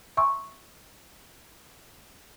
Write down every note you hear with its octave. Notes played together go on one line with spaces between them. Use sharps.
E5 G#5 A#5 C6 C#6 E6